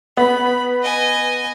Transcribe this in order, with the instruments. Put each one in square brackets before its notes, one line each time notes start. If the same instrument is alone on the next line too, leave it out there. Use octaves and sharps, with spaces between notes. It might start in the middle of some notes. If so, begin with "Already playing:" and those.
[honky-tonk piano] B3 [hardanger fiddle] B5
[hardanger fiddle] D#5 G#5